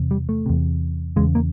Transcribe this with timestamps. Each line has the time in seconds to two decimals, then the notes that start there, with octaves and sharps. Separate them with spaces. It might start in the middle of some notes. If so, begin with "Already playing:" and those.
Already playing: E2 C3
0.11 G3
0.29 A3
0.46 E2 C3
1.16 E2 C#3 G#3
1.35 A#3